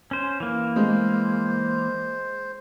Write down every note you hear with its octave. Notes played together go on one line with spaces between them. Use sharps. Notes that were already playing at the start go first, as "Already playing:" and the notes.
C#4 C5
E3 A#3
G#3 C5